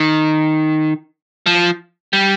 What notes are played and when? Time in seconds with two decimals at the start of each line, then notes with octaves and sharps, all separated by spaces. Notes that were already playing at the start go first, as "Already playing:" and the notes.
Already playing: D#3
1.46 F3
2.13 G3